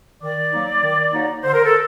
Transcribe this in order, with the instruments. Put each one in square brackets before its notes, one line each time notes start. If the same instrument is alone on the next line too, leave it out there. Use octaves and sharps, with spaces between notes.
[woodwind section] D#3 D5
F#3 A#3 D#4
D#3
F#3 A#3 D#4
D3 C5
A#4
A4